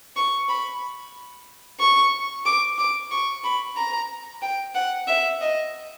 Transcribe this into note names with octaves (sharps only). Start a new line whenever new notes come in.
C#6
B5
C#6
D6
D6
C#6
B5
A#5
G5
F#5
E5
D#5